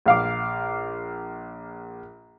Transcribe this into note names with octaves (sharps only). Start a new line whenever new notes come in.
A#1 F5 D6